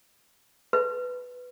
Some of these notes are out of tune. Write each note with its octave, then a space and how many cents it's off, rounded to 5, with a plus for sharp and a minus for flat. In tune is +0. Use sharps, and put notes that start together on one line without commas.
B4 +5